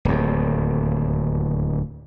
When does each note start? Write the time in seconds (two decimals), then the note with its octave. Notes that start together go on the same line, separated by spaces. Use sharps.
0.05 D1 D#2